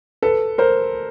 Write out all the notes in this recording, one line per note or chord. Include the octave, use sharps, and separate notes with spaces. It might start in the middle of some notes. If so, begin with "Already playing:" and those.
A4 B4
A#4 C5